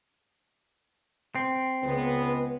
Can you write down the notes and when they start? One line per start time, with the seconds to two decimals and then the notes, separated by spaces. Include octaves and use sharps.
1.35 C4
1.83 C#2 G#3 B3